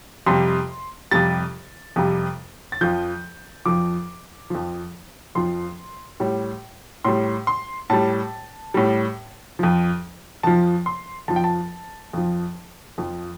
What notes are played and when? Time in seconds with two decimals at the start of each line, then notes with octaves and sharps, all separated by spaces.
0.26 F2 C3 G3 C6
1.11 F2 C3 G3 A6
1.96 F2 C3 G3
2.72 A6
2.81 F2 F3 G6
3.66 F2 F3 D6
4.50 F2 F3
5.35 F2 F3 C6
6.20 A2 G3
7.04 A2 G3 C6
7.47 C6
7.90 A2 G3 A5
8.74 A2 G3
9.59 F2 F3
10.43 F2 F3 A5
10.86 C6
11.28 F2 F3 A5
11.36 G5
11.44 A5
12.13 F2 F3
12.98 F2 F3